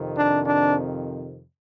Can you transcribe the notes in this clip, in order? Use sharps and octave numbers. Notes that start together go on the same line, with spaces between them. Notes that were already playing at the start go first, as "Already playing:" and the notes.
Already playing: F2 C3 D#3
D4
D4